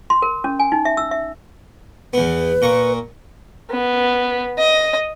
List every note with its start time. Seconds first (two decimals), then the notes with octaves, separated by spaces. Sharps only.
0.10 C6
0.22 A#4
0.44 C#4
0.59 G#5
0.72 D#4
0.85 E5
0.97 E6
1.11 E5
2.13 E2 B3 B4
2.62 A#2 A#5 C#6
3.70 B3
4.58 D#5